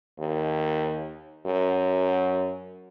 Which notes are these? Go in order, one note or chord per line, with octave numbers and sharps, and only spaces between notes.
D#2
F#2